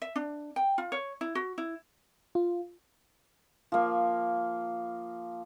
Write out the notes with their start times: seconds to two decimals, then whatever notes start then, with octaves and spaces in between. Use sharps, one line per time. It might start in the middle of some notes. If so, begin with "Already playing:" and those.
0.02 E5
0.16 D4
0.56 G5
0.78 F4
0.92 C#5
1.21 E4
1.35 F#4
1.58 E4
2.35 F4
3.72 F3 A#3